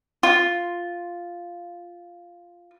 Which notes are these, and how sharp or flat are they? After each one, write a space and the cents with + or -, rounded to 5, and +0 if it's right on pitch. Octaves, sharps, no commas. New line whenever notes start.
F4 +0